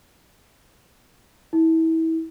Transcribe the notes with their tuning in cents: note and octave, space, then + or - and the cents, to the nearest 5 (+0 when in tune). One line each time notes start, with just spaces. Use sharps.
E4 -30